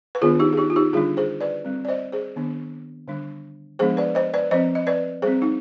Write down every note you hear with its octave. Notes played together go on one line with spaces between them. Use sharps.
B4
D#3 B3 D4 F4 G#4
D#4 G4
G#4
D#4 G4
F4
D#4 G4
D3 G3 D4 F4 G#4
G#4 C5
B4 D5
G3 C4
D5
C5 D#5
G#4 C5
D#3 B3 D4
D3 G3 D4
F3 G#3 B3 D4 G#4 C5
B4 D5
C5 D#5
B4 D5
F3 C4 C5 D#5
D#5
B4 D5
G3 C4 G#4 C5
D#4